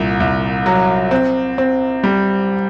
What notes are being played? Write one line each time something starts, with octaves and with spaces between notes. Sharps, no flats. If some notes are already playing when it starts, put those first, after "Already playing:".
Already playing: C2 A#2
C2
F#3
C4
C4
G3